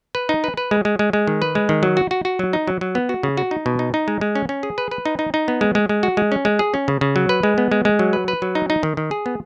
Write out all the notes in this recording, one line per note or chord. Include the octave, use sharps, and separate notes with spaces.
B4
D#4
B4
B4
G#3
G#3
G#3
G#3
D#3
B4
G#3
D#3
F#3
F#4
F#4
F#4
F#3
D#4
F#3
F#3
B3
F#4
C#3
F#4
D#4
B2
D#4
D#4
G#3
G#3
C#4
C#4
G#4
B4
B4
D#4
D#4
D#4
B3
G#3
G#3
G#3
F#4
G#3
C#4
G#3
G#4
C#4
C#3
C#3
F#3
B4
G#3
B3
G#3
G#3
F#3
B4
B4
F#3
D#4
D#4
D#3
D#3
G#4
B3